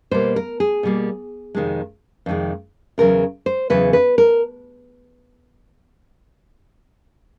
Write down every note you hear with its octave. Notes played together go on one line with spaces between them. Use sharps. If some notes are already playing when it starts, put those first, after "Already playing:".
B2 G3 A#3 C5
A#4
G#4
B2 G3 A#3
F2 C3 D#3 G#3
F2 C3 D#3 G#3
E2 C#3 F#3 A#4
C5
E2 C#3 F#3 B4
B4
A#4